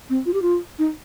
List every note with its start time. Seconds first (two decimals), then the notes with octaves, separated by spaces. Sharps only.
0.09 C4
0.26 F4
0.33 G4
0.42 F4
0.79 D#4